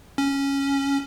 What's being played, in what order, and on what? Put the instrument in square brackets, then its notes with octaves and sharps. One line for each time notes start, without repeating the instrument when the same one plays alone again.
[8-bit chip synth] C#4